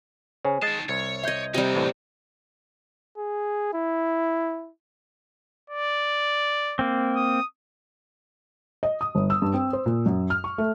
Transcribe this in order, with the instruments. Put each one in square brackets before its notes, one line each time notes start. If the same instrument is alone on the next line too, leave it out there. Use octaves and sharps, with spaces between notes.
[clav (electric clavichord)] C#3 [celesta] C5 C#5 G#5
[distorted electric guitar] D#3 A5 [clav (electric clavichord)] G#3 D#5 [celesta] A6 C7
[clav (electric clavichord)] C2 [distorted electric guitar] C#5
[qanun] D#5 C6 [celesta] E5 G6 G#6
[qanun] C3 G3 [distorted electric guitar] A#3 D#4
[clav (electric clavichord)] A1 A2
[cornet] G#4
E4
[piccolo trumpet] D5
[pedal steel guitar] A#3 C4
[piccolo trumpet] D#6
[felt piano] D#5
D#6
G1
E6
G2
C4
C5
A#2
F#2
F6
C#6
A3